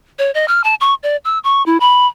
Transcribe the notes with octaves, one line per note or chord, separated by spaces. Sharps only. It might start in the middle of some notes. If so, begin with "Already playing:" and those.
C#5
D#5
F6
A5
C#6
D5
E6
C#6
E4
B5